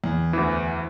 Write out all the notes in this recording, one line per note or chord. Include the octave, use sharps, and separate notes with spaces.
E2
D2 E3